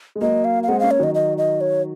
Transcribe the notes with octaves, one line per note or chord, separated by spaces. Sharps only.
G#3
F#3 A#3 D#5
F5
F5
G#3 C4 F#5
A#3 C#4 F5
C#5
D#3 F#3 D#5
D#5
D#5
C#5